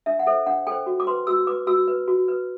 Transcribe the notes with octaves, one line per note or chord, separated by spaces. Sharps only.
D4 E5
F#5
A4 C5 E5
D4 F#5
A4 C5 G5
F#4
D6
B4 C6
F#4 E6
B4 D6
F#4 E6
B4
F#4
B4